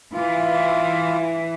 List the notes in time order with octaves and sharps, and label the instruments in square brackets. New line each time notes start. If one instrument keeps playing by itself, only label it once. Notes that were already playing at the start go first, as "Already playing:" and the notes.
[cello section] E3 [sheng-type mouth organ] F4